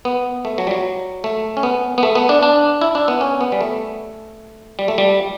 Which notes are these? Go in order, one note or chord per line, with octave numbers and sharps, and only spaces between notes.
B3
A3
F#3
G3
F#3
A3
C#4
B3
B3
A3
B3
D4
D4
E4
D4
B3
C#4
B3
G3
A3
G3
A3
G3